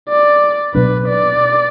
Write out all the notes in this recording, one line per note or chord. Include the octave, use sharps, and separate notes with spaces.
D5
B2 F#3 B3 D4 B4
D5